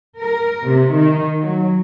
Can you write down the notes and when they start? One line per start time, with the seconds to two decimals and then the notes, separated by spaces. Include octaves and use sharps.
0.20 A#4
0.66 C3
0.96 D#3
1.41 F#3